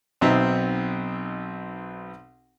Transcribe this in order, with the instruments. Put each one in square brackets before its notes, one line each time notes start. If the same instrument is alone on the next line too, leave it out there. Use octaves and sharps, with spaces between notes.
[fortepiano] B1 B2 C4 D#4 E5 A#5